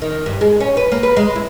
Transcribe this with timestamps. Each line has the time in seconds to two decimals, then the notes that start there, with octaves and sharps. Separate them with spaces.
0.02 D#3
0.26 G2
0.41 G#3
0.60 C#4
0.77 B4
0.92 A#3
1.03 B4
1.17 G#3
1.35 E4